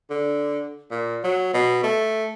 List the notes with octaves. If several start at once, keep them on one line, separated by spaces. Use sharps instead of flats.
D3
A#2
F#3
B2
A3